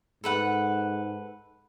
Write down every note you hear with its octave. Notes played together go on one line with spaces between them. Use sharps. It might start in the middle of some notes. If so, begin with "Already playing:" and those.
G#2 A4 B4 F#5